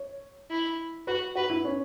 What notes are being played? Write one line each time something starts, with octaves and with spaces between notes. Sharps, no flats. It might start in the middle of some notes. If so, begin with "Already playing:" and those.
Already playing: C#5
E4
F#4 B4
F#4 B4
E4
C#4